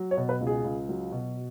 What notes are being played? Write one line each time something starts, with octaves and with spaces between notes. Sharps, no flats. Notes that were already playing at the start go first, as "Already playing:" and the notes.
Already playing: F#3
C#5
B2
B4
C#2
G#4
C#2
F#3
B2